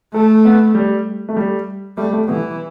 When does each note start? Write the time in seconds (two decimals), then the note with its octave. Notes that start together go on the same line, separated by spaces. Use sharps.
0.14 A3 A4
0.45 B3
0.75 G3
1.29 A3
1.36 G3
1.97 G3 A3
2.13 A3
2.28 E3 B3